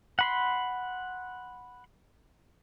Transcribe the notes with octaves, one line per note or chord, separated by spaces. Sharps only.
F#5 B5 C6